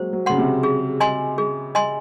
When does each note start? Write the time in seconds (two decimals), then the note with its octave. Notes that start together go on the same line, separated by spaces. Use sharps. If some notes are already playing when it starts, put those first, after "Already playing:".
Already playing: F#3 G#3 A#3 C5
0.13 F#3
0.26 C#3 F#5 C6
0.38 C3
0.63 G#4
1.00 D#5 G#5 C6
1.38 G#4
1.75 D#5 G#5 C6